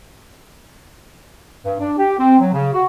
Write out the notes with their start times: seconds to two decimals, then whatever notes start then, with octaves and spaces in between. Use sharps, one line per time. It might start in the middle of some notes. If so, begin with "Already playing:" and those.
1.65 G2
1.79 D4
1.98 G4
2.19 C4
2.40 F#3
2.53 C#3
2.73 F#4